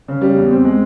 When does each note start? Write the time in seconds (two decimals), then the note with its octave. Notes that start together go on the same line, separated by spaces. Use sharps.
0.08 C#3
0.21 G3
0.36 E2
0.51 C4
0.65 G#3